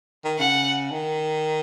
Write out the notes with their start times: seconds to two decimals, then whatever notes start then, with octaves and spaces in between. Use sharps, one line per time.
0.24 D#3
0.39 C#3 F#5
0.92 D#3